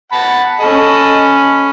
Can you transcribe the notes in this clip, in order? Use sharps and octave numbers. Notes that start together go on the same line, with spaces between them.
F#5 A5 B5
C#4 A4 D#5 B5